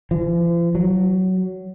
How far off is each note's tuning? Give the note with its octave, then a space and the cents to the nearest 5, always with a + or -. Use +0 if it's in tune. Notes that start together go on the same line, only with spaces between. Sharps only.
F3 -45
F#3 +15